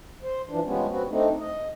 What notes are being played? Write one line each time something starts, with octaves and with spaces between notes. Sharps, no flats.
C5
E3 F3 D4
F3 G3 G#3 B3 C#4
B3 C4 F#4
A3 C4 D4 D#4
D#5